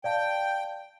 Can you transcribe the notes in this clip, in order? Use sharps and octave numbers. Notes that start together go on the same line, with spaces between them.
D5 F5 G5 A5